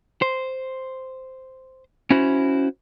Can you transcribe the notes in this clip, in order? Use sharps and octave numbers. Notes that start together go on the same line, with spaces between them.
C5
C#4 E4 F#4 C5